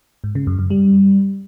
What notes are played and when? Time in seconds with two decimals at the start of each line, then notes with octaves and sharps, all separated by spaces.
0.24 G#2
0.35 C#3
0.47 F#2
0.59 F#2
0.70 G3